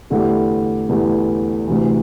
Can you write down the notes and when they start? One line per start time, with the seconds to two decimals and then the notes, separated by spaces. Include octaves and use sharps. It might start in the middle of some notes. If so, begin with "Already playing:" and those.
0.10 E2 D3 A3 E4 G4
0.89 E2 D3 A3 E4 G4
1.67 D2 C3 E3